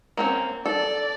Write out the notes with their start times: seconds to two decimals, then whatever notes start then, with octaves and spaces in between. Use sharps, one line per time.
0.17 A#3 C4 C#4
0.66 A4 D5